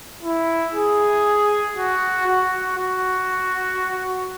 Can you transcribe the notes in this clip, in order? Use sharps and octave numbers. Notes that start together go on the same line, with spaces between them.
E4
G#4
F#4
F#4
F#4